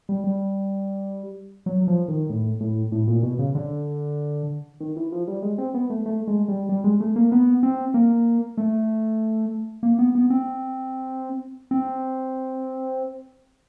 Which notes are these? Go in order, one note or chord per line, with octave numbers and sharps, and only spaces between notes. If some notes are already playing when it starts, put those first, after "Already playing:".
G3
G3
F#3
F3
D#3
A2
A2
A2
A#2
B2
C#3
D3
D#3
E3
F3
G3
G#3
C4
B3
A3
A3
G#3
G3
G3
G#3
A3
A#3
B3
C4
A#3
A3
A#3
B3
B3
C4
C4